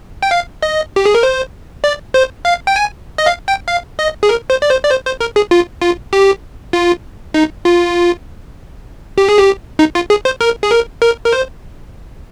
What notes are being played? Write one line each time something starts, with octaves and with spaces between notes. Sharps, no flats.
G5
F5
D#5
G4
G#4
A#4
C5
D5
C5
F5
G5
G#5
D#5
F5
G5
F5
D#5
G#4
A#4
C5
D5
C5
D5
C5
C5
A#4
G#4
F4
F4
G4
F4
D#4
F4
G4
G#4
G4
D#4
F4
G#4
C5
A#4
G#4
A#4
A#4
A#4
C5